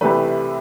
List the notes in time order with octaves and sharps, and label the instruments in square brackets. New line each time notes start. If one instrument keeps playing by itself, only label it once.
[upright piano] C2 C3 E3 A3 B4